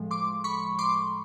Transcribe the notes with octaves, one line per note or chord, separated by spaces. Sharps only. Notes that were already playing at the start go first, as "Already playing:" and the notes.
Already playing: A2 F3 G#3
C6 D6
B5 C#6
C6 D6